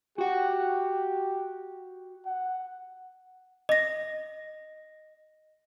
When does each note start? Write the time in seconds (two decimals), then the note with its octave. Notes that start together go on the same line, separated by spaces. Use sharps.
0.18 F#4 G4 F#5
2.26 F#5
3.69 D#5 A#6